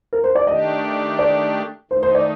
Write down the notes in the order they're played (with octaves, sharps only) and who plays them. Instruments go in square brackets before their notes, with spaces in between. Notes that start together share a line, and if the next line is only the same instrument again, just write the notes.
[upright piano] A#4
C5
D5
[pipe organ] D#3 A3 D4 G4 [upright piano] D#5
[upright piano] D5
[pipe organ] D#3 A3 D#4 [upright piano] C5
[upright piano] C5
D5